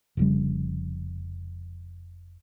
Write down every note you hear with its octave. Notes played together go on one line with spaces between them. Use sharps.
F1 F2 C#3 G3